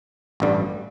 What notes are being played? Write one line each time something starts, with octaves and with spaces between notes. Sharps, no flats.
A1 G2 D3 G3